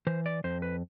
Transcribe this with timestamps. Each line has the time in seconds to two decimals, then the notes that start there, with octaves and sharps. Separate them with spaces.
0.07 E3 C5
0.26 D5
0.44 F2 C5
0.62 B4